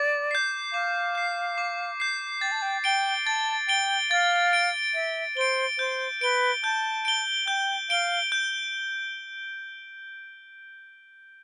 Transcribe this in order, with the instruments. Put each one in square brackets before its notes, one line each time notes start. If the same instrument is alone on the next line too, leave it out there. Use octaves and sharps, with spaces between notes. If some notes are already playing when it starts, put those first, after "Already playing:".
Already playing: [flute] D5 [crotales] D6
[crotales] G6 C7
[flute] F5 [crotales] D6
[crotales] G6 C7
D6
G6 C7
[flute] G5 [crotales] A6
[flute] A5
G5
[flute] G5 [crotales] D7 G7
[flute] A5 [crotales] A6
[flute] G5 [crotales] D7 G7
[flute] F5 [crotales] A6
[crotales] D7 G7
[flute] E5 [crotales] A6
[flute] C5 [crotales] D7 G7
[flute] C5 [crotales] G6
[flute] B4 [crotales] D7 G7
[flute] A5 [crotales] G6
[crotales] D7 G7
[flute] G5 [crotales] G6
[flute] F5 [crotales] D7 G7
[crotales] G6